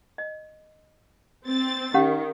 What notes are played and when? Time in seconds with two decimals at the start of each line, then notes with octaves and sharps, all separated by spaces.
0.18 D#5
1.46 C4 A6
1.94 D#3 C#4 G4 F5